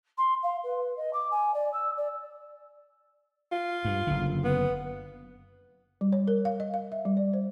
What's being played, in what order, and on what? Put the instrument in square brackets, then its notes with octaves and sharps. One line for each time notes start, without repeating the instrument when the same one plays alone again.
[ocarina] C6
F5
B4
D#5
D6
G#5
D5
E6
D5
[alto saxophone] F4
[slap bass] G2
F#1 D3
[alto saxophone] B3
[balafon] G3
C#5
A#4
F5
D#5
F5
E5
G3
D5
C5